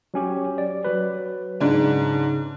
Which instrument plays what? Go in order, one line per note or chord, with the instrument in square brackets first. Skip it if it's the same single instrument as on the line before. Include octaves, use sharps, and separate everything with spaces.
[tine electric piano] F#3 C#4 G4
D5
F#3 B4
[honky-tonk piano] G#2 D4 [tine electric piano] C#3